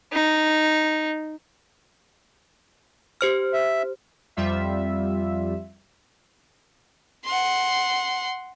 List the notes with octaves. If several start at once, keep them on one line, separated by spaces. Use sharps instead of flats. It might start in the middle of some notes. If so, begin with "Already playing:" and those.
D#4
G4 C5 F6
E5
F2 G3 F4 E5
F#5 C6